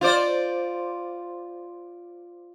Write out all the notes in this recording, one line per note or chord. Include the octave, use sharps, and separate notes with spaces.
F4 C5 D5